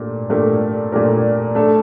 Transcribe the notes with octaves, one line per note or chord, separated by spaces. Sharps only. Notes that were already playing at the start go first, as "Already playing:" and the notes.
Already playing: A#2 A3 D4 G4 A#4
A#2 A3 D4 G4 A#4
A#2 A3 D4 G4 A#4
A3 D4 A4